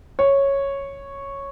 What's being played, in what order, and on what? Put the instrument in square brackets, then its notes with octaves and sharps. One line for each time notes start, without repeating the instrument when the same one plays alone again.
[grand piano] C#5